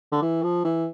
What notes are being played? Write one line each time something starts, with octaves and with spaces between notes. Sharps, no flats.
D3
E3
F3
E3